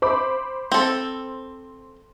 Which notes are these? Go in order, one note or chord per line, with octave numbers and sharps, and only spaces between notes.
C5 B5 D6
C4 A4